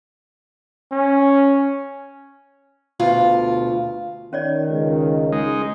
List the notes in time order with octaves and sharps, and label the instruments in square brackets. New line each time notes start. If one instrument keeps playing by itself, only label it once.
[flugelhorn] C#4
[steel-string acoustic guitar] D2 B2 F4
[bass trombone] D#3 [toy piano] C#4 C#5 D5
[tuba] C#2
[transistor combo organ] G#3 D#4